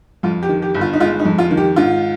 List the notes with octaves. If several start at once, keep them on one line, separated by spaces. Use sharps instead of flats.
F2 F4
G4
D#3
G4
G1
F4
D#4
G#3 F4
D#4
F2
F4
D#3
G4
G#2 F4